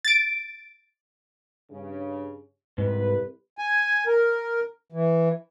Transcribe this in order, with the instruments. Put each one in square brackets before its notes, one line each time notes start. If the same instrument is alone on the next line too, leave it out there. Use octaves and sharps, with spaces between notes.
[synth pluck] A6 D7
[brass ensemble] G2 C#3
[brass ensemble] C2 B4 [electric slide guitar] G#2
[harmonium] G#5
A#4
E3